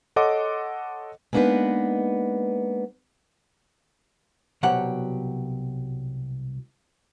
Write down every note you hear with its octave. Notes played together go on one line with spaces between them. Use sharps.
A4 C#5 D#5 F#5 C6 D6
G#3 A#3 B3 D4 D#4 B4
C2 B2 F#3 G4 F#5